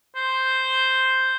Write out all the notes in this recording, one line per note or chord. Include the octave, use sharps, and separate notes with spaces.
C5